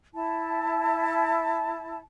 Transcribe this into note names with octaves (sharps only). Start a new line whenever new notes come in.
E4 A5